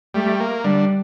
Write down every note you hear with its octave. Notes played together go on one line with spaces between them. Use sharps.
G3 A3
A#3
D3 G3